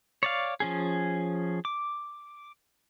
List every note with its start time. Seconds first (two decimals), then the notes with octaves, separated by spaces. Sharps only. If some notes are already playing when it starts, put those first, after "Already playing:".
0.23 C#5 D5 F5
0.60 F3 C#4 G#4
1.65 D6